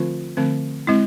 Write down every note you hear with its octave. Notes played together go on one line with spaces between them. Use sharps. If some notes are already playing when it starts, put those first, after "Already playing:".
Already playing: D3 F3 A3 C4 F4
D3 F3 A3 C4
G#3 C4 E4